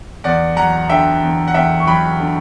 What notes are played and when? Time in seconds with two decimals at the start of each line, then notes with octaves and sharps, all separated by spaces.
0.24 E2 D5 F#5
0.56 F#3 F#5 A#5
0.90 D3 E5 G5
1.22 E2
1.48 F#5
1.54 E2 E5 G5
1.80 C#6
1.87 F#3 G5 B5
2.20 D3